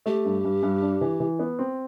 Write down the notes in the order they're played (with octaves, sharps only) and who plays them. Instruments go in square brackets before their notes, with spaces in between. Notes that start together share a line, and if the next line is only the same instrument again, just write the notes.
[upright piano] A3 [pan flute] G4
[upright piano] G2
G2
G2
D4
E3
E3
B3
C4